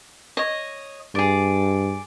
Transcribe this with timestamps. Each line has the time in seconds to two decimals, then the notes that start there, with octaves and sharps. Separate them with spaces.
0.37 C#5 D#5
1.15 G2 G#4 D5